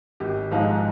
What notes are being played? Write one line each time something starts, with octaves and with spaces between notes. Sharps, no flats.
G#1 G4
G#2 F3 G#3